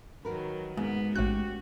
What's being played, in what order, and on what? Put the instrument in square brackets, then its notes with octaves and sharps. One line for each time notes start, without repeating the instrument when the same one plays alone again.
[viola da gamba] D#3 F#3 [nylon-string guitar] F#4 A#4 B4
[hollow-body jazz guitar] G#2 [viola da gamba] A#3 B3
[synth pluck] A1 F#6 [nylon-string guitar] C#4 G4 [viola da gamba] F#4